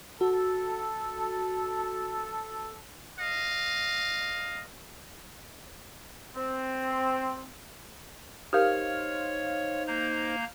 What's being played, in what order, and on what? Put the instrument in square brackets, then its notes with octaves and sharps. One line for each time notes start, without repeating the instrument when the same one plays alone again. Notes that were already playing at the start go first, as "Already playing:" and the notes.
[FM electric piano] F#4 [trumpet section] A4
[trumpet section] D#5 F5
[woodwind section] C4
[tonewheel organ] D#4 C5 [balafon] G4 A#4 [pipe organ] C#5 [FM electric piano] F5 F6
[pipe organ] A#3 A#5 G6